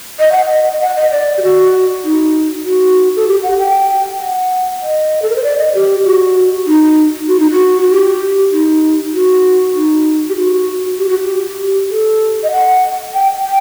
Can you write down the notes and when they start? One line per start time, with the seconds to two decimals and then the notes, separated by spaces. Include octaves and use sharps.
0.19 D#5
0.32 F#5
0.45 D#5
0.73 D#5
0.81 F#5
0.96 D#5
1.12 D5
1.38 G4
1.43 F#4
2.04 D#4
2.66 F#4
3.16 A4
3.27 G4
3.43 F#5
3.58 G5
4.20 F#5
4.82 D#5
5.22 A4
5.30 A#4
5.36 C5
5.44 D5
5.59 D#5
5.74 G4
6.05 F#4
6.67 D#4
7.28 F#4
7.40 D#4
7.51 F#4
7.82 F#4
7.90 G4
8.52 D#4
9.13 F#4
9.75 D#4
10.30 G4
10.37 F#4
10.98 G4
11.09 F#4
11.20 G4
11.90 A4
12.43 D#5
12.52 F#5
13.14 G5
13.45 G5